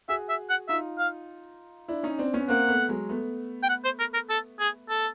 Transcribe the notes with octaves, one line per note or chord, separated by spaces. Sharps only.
F#4 G#4 E5
E5
F#5
D#4 F4 E5
F5
D4 E4
C#4 D#4
C4 D4
B3 C#4
A#3 C4 F#5
A3 B3
F#3 G#3
A3 B3
G5
F#5
C5
A#4
A#4
A4
G#4
A4